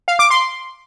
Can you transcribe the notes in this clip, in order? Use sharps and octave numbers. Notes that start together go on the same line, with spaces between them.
F5
D6
C6